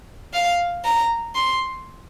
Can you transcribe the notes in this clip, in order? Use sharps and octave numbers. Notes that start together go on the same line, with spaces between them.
F5
A#5
C6